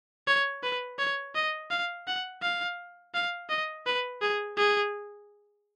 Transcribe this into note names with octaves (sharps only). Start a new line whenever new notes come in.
C#5
B4
C#5
D#5
F5
F#5
F5
F5
D#5
B4
G#4
G#4